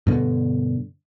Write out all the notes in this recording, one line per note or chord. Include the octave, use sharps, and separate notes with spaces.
G2 B2 D3